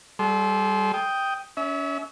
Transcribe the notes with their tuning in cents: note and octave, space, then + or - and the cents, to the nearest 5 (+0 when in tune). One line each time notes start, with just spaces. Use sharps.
G3 +0 A4 -35 C6 +0
G5 +0 D#6 +5
C#4 +35 E5 -30